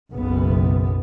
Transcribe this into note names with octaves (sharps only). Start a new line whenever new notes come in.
F#1 B1 B3